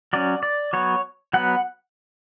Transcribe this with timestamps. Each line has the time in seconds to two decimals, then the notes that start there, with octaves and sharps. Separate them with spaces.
0.13 F#3 C#4 D5
0.43 D5
0.73 F#3 B3 C#5
1.33 F#3 B3 F#5